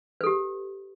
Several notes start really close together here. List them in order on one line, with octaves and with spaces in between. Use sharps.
B4 A4 G4